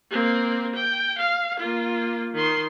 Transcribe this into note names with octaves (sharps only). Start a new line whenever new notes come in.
A#3 C4
G5
F5
A#3 F4
D#3 C6